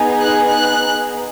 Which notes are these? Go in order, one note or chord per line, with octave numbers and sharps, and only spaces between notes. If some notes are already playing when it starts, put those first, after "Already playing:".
Already playing: B3 D#4 G#4
F#6
F#6